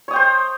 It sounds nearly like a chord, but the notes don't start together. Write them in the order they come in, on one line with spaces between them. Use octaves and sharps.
C#5 D#6 G5 C5